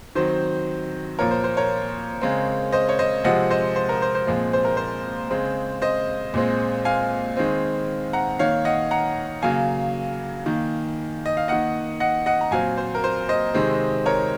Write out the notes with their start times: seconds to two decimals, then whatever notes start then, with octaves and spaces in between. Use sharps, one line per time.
0.15 D#3 F#3 C4 C5
1.19 A#2 F3 A#3 A#4 C#5
1.31 C5
1.44 C5
1.57 A#4 C#5
2.21 C#3 G#3 C4
2.72 C5 D#5
2.89 C#5
2.99 C5 D#5
3.24 C3 F3 G#3 C4 D#5 F#5
3.50 C5 D#5
3.76 C5
3.89 A#4
4.02 C5
4.15 C5
4.27 A#2 F3 G#3 C4
4.53 C5
4.65 A#4
4.77 C5
5.30 C#3 G#3 C4
5.82 C5 D#5
6.34 A#2 G#3 C4
6.85 F5 G#5
7.37 D#3 G#3 C4
8.13 F#5 A#5
8.39 D#3 A#3 C#5 F5
8.65 D#5 F#5
8.91 F#5 A#5
9.42 C#3 F#3 A#3 F5 G#5
10.46 D#3 A#3
11.26 D#5
11.37 F5
11.48 D#3 A#3 D#5 F#5
12.00 D#5 F#5
12.26 D#5 F#5
12.41 A#5
12.51 A#2 F#3 C4 F5 G#5
12.77 C5
12.95 A#4
13.04 C5
13.29 C5 D#5
13.54 C3 D#3 G#3 C4
14.06 A#4 C#5